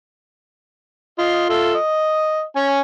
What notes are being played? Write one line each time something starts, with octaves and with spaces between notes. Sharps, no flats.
F4 D#5
F4 A4 E5
D#5
C#4 G#5